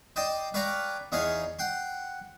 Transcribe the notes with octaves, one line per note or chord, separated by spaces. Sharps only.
C5 D5 D#5 G5 C6
B4 C#5 D5 F5 G5 A#5
E2 D#4 G#4 C#5 F5 C6
F#5 G5 C6